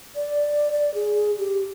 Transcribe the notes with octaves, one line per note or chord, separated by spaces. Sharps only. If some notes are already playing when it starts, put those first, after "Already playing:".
D5
D5
G#4
G4